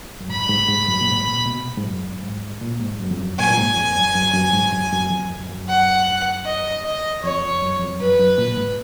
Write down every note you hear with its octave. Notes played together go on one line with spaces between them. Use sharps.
F#2
G#2 B5
G#2
G#2
F#2
A#2
G#2
A#2
B2
G#2
F#2
G#2
A#2
G#2
F#2
F2
F#2
A#2 G#5
A#2
G#2
F2
F#2
F#2
F#2
G#2
F#2
F#2
F2
F#2
F#2
F#5
D#5
D#5
F2 C#5
F2
F#2
F2
F#2 B4
F#2
A#2
G#2